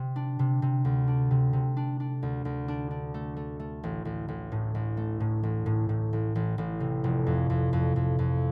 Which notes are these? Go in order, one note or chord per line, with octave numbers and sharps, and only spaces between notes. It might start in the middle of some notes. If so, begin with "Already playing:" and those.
Already playing: C3
D4
C3
C3
D2
D4
C3
C3
D4
D4
D2
D2
D4
D4
A3
A3
A3
A1
A1
A1
A2
A1
A3
A2
A1
A2
A2
A1
A1
A1
C3
F1
F2
F2
F2
F2
F2